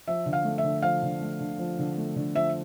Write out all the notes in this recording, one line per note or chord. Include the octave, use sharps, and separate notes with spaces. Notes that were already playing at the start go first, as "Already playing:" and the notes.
F3 E5
D3
F5
A3
E5
D3
F3 F5
D3
A3
D3
F3
D3
A3
D3
F3 E5